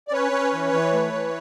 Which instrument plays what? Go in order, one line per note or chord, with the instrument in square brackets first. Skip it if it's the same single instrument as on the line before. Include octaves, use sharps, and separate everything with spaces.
[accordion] D5
C#4 B4 C#5
C#4
E3
E3
A3
E3